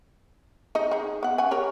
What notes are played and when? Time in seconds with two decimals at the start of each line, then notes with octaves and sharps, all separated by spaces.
0.75 D#4 D#5
0.91 D#4 G#4
1.23 B3 F#5
1.38 C#4 F#5 G#5
1.51 G4 A#4 C#5